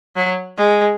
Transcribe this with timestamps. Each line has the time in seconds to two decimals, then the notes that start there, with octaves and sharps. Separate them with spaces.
0.16 F#3
0.58 G#3